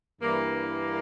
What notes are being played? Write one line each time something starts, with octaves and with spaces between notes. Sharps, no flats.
G2 E3 A#3